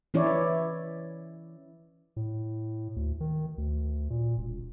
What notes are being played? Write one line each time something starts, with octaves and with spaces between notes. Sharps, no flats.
E3 C#4 E4 C#5 D5
A2
D2
D#3
D2
A#2
E1